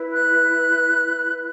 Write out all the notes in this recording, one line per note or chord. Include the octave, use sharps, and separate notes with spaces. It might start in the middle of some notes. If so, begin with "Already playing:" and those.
Already playing: E4 B4
F#6